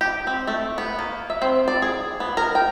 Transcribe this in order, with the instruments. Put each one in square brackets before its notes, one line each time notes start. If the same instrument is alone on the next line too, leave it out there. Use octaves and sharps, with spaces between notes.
[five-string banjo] G4
C4
A3
B3
A#3
E5
C4
D5
G#4
B3
A#4
G5